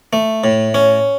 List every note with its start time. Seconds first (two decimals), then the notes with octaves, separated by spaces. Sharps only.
0.13 A3
0.44 A2
0.74 C#4